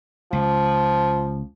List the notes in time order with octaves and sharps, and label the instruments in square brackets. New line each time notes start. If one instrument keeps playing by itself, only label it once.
[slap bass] C#2 [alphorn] F3